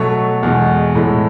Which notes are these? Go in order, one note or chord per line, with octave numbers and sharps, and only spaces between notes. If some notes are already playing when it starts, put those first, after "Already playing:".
Already playing: B2 F#3 A3 C#6
E2 B2 G#3
A2 E3 G#3